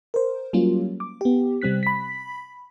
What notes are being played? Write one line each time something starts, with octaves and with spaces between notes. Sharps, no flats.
A#4 C5
F#3 G3 A#3 C#4 F4
D6
B3 G4
C3 G3 C4 F#6 B6
B5 B6